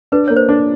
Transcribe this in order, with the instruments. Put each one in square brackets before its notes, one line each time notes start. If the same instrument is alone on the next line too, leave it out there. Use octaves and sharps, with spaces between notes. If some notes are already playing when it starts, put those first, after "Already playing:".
[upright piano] D4 [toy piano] B4
[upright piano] A#3 [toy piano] C#5
[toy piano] C5
[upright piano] D4